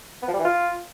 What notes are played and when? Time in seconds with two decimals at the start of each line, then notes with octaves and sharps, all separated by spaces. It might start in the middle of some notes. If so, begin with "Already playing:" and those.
0.22 B3
0.28 F3
0.34 G3
0.39 E3
0.45 F4